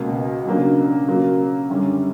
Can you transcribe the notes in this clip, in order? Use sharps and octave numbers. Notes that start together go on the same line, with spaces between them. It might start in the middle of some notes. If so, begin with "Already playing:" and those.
Already playing: C#2 B2 A#3
C#3 F#3 A#3 D4
C#3 F#3 A#3
F#2 D3 G3 C#4